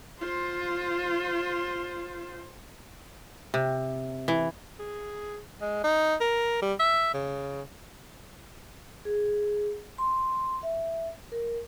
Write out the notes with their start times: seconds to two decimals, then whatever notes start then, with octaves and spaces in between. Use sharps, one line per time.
0.21 F4 C5
3.54 C3
4.28 E3
4.79 G#4
5.61 G#3
5.84 D#4
6.21 A#4
6.62 G3
6.79 E5
7.14 C#3
9.05 G#4
9.98 C6
10.63 E5
11.32 A#4